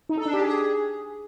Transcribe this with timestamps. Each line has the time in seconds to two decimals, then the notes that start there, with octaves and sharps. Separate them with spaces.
0.09 D#4
0.17 A4
0.25 D4
0.33 G4
0.41 G#4